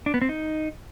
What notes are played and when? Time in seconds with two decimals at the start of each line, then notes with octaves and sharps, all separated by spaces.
0.06 D4
0.14 B3
0.22 C4
0.29 D#4